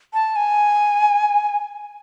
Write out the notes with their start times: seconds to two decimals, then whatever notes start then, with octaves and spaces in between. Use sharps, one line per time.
0.14 A5
0.36 G#5